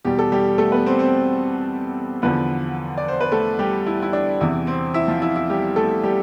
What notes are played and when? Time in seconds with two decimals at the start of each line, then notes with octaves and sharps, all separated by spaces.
0.05 E2 B2 G3 G4
0.19 A4
0.32 G3 G4
0.58 A3 A4
0.72 B3 B4
0.86 C4 C5
0.99 C4 C5
2.22 E2 D3 F3 B3 B4
2.98 D5
3.08 C5
3.20 B4
3.32 A3 A4
3.59 G3 G4
3.86 E4
4.02 E4
4.13 D4
4.40 E2 C3 E3 E4
4.67 C4 C5
4.94 E4 E5
5.08 F3 F4
5.22 E4
5.36 E4
5.50 G3 G4
5.76 A3 A4
6.03 G3 G4